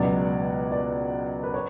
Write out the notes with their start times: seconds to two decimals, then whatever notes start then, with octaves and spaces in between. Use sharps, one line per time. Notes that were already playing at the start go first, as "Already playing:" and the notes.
Already playing: C#2 B2 F#3 D5
0.72 D5
1.43 B4
1.54 C#5